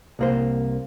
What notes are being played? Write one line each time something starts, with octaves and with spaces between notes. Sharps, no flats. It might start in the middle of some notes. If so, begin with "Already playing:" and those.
C2 A#3 C5